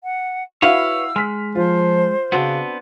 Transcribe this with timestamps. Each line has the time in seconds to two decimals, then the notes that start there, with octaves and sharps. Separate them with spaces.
0.03 F#5
0.62 E4 F#4 B4 C#5 F5 E6
1.16 G#3 F6 B6
1.55 F3 F4 C5
2.32 C#3 B3 C4 D4 F#4